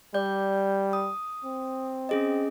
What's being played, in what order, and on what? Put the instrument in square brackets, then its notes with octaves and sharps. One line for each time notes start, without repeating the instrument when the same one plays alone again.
[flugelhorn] G3 [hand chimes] D5 G6
[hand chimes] D#6
[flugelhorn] C4
[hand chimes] C#4 G#4 D#5